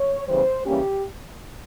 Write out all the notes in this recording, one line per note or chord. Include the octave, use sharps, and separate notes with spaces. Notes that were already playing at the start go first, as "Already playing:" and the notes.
Already playing: C#5
E2 C#3 E3 G3 C5
C#3 E3 G3 A#3 C#4 G4